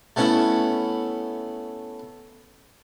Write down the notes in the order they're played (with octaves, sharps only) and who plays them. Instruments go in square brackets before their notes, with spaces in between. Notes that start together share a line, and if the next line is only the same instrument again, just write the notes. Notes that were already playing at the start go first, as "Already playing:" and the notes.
[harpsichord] A3 B3 C#4 E4